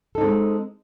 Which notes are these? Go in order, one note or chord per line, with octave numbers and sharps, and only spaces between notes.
G#3 C4 D#4 A4